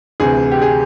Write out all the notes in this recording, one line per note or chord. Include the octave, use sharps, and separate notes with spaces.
D2 C3 E3 G#4
G4
G#4